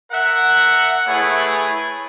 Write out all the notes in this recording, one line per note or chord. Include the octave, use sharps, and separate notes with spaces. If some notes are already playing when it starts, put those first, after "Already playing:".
A#4 E5 F#5
A3 E4 G#4 B4 C#5